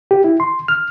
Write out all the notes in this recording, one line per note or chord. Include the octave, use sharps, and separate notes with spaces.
G4
E4
C6
F6